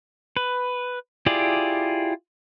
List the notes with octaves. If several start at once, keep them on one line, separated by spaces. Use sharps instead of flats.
B4
E4 F4 G4 G#4 D5